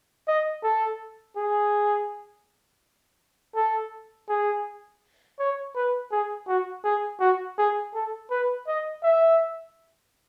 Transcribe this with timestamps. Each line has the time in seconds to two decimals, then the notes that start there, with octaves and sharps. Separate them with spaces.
0.28 D#5
0.63 A4
1.36 G#4
3.55 A4
4.29 G#4
5.39 C#5
5.75 B4
6.11 G#4
6.47 F#4
6.84 G#4
7.20 F#4
7.58 G#4
7.94 A4
8.30 B4
8.67 D#5
9.03 E5